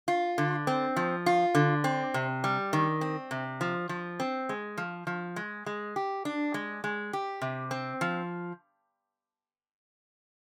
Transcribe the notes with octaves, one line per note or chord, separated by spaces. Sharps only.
F4
D3
C4
F3
F4
D3
C4
C3
G3
D#3
C4
C3
F3
F3
C4
G#3
F3
F3
G#3
G#3
G4
D4
G#3
G#3
G4
C3
C4
F3